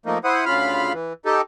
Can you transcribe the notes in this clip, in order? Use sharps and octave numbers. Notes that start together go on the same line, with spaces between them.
F3 A3 A#3 D#4
E4 C5 F#5 D#6
D2 C#3 F4 F5 B5 F6
E3
D#4 G4 A4